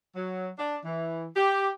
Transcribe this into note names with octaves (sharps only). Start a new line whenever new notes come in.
F#3
D4
E3
G4